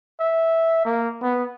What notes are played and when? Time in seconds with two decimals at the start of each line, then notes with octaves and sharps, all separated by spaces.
0.20 E5
0.85 A#3
1.23 B3